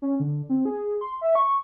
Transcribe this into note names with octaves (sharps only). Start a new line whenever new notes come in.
C#4
D3
C4
G#4
C6
E5
C#6